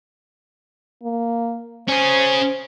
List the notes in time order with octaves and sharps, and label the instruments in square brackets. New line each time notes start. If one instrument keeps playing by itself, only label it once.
[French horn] A#3
[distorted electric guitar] C#4 G#4 [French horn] C5